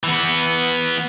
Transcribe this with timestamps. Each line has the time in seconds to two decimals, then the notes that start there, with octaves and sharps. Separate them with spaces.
0.04 E3 B3